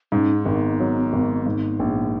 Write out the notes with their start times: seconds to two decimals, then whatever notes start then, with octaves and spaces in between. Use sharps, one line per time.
0.12 G#2 C#4
0.35 D#4
0.46 G#1
0.57 B3
0.80 F#3
1.13 G#1
1.46 G#2
1.79 A#1